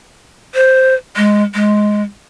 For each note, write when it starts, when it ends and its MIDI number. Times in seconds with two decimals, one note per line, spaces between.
0.55 0.94 72
1.16 1.43 56
1.54 2.03 56